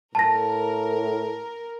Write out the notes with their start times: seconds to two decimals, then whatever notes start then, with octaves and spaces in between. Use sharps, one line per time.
0.15 A2 A#4 A5 A#6